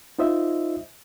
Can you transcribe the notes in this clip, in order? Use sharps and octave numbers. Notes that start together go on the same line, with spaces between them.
D#4 F4 C5 D#5 E5